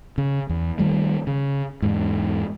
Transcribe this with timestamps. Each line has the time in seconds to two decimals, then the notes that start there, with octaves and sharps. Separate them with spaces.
0.18 C#3
0.49 E2
0.78 D#3 E3 G3 A3
1.27 C#3
1.82 E2 G#2